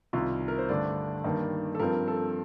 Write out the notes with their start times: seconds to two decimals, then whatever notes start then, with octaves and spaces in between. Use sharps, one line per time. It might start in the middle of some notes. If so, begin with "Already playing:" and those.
0.13 C2 C3 D#3 F4
0.48 A#4
0.58 C5
0.69 G2 D3 A3 D4 D5
1.24 G2 D#3 A#3
1.75 A4
1.79 G2 F3 C4 A#4
2.08 A4